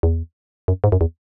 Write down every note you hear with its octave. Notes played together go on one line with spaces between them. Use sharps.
E2
F#2
G#2
F#2
E2